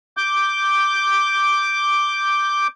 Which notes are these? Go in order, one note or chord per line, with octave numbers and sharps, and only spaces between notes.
D6 G6